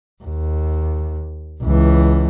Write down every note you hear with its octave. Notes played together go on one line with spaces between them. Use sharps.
D#2
C#2 E3